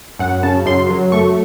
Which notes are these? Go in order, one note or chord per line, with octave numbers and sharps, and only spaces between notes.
F#2 F#5
C#3 A5
F#2 C6
F#3
A3 C#6